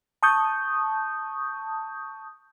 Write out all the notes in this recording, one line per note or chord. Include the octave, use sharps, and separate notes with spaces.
A5 C#6 D#6 G6